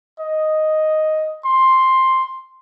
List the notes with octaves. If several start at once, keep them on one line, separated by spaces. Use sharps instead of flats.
D#5
C6